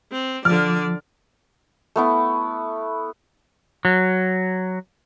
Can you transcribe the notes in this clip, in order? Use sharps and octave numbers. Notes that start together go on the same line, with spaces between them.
C4
D3 F3 D5 F6
A3 B3 E4
F#3